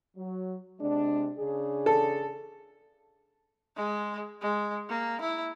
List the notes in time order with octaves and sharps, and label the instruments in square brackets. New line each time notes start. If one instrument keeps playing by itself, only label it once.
[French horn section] F#3
C3 G#3 D4
C#3 D4 G#4
[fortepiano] A4
[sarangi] G#3
G#3
A#3
E4